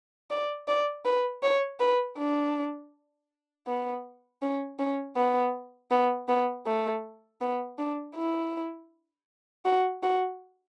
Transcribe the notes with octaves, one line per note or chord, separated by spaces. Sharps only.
D5
D5
B4
C#5
B4
D4
B3
C#4
C#4
B3
B3
B3
A3
B3
D4
E4
F#4
F#4